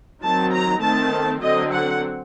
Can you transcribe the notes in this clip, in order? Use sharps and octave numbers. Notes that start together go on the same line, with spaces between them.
D#3 F#3 C4 A5
A#5
D#3 A3 C4 A5
D3 F#3 C4 D#5
F#5